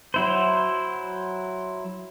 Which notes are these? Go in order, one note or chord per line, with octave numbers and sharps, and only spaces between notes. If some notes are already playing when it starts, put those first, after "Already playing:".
F#3 E4 C5